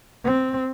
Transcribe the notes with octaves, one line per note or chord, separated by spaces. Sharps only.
C4